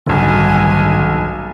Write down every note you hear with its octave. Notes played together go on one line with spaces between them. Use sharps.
F#1 B1 G#2 D3 D#3 G3 G#5